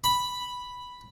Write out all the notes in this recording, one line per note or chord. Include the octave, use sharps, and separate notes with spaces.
B5